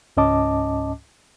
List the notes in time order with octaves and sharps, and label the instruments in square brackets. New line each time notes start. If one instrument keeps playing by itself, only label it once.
[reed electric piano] C#2 G#2 C#4 D#5 A5 D6